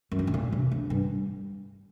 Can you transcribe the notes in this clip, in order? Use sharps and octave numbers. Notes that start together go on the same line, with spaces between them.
F#2
G2
A2
A#2
C3
D3
G2